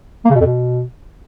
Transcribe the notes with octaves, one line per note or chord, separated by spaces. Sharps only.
A#3
C#3
B2
F2
B2